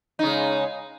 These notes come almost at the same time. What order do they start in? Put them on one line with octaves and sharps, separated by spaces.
D#4 C#3 G#3